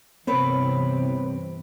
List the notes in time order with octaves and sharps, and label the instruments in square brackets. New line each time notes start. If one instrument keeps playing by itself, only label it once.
[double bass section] G2 C3 E3 [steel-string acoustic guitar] B3 B4 C#5 [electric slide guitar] C4